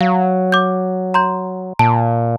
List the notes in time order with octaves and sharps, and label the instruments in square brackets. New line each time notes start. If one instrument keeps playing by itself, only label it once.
[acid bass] F#3 [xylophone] F5
[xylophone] D6 G6
A#5 C6 G6
[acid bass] A#2 [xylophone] A5